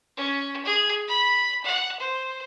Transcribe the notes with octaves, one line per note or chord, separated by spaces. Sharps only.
C#4
G#4
B5
F#5
C5